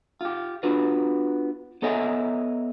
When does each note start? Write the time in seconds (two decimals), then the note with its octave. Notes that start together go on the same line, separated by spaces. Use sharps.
0.21 F4 G4
0.63 B3 D4 F4 F#4 B4
1.82 B3 A4 C#5 D#5 E5 G#5